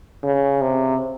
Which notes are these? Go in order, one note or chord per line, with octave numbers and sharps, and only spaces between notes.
C#3
C3